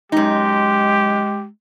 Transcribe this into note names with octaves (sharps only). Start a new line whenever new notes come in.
F#2 G#3 D#4 G4